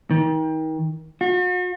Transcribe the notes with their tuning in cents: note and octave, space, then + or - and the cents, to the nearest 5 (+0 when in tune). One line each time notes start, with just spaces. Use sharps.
D#3 +30
F#4 -40